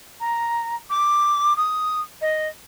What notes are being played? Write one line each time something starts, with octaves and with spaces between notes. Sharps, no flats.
A#5
D6
D#6
D#5